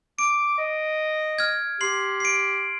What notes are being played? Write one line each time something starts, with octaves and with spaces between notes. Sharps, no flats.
D6 D7
D#5
F6 G#6
G4 C6 C7 F#7
C7 D7